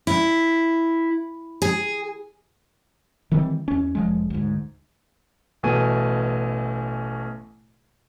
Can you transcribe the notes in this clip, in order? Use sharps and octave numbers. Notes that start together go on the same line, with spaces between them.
E4
G#4
D#3 E3 G3 C4
E2 C#4
F1 F3 G#3
D2 G#2
A1 B2 A3 G#5 D#7